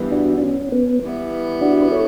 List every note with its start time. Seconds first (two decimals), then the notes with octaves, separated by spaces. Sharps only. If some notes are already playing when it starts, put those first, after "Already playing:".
Already playing: G2 E3 B3
0.12 D4 F#4
0.38 D4
0.42 C#4
0.72 B3
1.02 E3 G3 B3 E4
1.61 D4 F#4
1.82 B4
1.91 A4 C#5